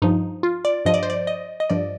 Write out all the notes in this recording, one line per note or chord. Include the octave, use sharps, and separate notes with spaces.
G2 F3 D#4
F4
D5
G2 F3 D#5
D5
C5
D5
D#5
D#5
G2 F3 D5